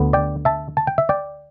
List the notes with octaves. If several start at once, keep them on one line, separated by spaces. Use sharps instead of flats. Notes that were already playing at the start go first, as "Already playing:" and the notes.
Already playing: D2 D3 B3
D5 G5
E5 A5
A5
G5
E5
D5 G5